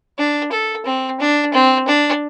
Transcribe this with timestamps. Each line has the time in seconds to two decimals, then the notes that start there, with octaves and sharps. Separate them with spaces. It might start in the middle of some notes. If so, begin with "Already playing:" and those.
0.18 D4
0.52 A4
0.85 C4
1.20 D4
1.53 C4
1.87 D4